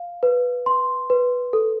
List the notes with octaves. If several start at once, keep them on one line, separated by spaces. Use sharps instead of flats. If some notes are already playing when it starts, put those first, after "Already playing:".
Already playing: F5
B4
C6
B4
A4